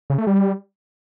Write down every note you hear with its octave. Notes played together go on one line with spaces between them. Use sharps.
C#3
A3
G3